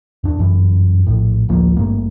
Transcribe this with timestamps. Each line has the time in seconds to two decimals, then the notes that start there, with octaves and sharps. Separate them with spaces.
0.24 E2 D4
0.38 G1 F#2 E3
1.07 A#1 A2
1.49 A1 D2 F3 A#3
1.77 G#1 G2 A3 A#3